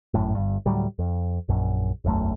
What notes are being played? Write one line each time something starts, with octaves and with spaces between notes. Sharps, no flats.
G#1 F#2 A2
G1 G2
D2 A2 F#3 G3
F2
A#1 F#2
E1 B1 F#2 A3